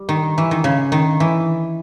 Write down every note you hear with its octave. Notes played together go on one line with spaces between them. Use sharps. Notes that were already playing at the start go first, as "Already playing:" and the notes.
Already playing: G3
D#3
E3
D#3
C#3
D#3
E3